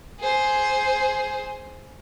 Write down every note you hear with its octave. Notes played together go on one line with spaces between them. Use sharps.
G#4 C5